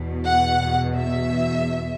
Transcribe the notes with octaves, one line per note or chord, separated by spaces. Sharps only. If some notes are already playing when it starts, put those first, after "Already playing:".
Already playing: E2 B2
F#5
E5